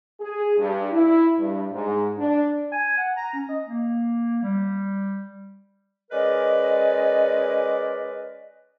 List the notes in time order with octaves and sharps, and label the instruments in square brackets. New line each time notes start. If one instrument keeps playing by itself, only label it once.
[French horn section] G#4
G2
E4
G2
G#2
D4
[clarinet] G#5
F#5
A#5
C#4
D#5
A#3
G3
[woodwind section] G#3 C#4 A#4 B4 D5 D#5